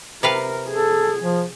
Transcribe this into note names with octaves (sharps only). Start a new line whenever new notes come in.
C3 A#4 B4 F5
G#4 A4
F3